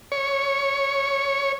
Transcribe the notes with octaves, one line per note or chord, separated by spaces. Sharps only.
C#5